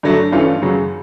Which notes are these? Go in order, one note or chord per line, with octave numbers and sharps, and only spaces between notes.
G2 D3 F#3 A3
G2 E3 A3 C#4 F4
F#2 C#3 F#3